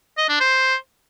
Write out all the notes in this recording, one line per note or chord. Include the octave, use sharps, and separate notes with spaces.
D#5
D4
C5